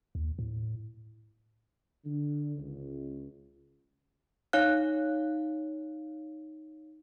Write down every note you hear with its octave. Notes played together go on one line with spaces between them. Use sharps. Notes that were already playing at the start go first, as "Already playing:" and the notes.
D#2
A2
D3
C#2
D#4 C#5 F5 F#6